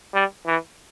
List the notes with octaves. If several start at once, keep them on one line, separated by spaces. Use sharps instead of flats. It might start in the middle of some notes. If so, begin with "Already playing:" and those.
G3
E3